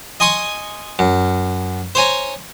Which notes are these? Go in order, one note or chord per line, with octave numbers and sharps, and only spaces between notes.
D#5 G#5 C6 C#6 D#6
F#2
C5 C#5 G#5 A#5